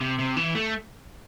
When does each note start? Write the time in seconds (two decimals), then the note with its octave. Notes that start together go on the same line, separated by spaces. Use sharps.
0.01 C3
0.19 C3
0.37 E3
0.55 A3